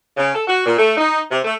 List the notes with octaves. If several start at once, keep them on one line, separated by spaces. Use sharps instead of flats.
C#3
A4
F#4
A#2
A3
D#4
C3
A3